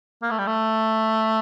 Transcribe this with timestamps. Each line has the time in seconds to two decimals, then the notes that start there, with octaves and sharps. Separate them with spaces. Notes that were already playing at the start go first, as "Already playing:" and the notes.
0.23 A#3
0.31 A3
0.39 G3
0.47 A3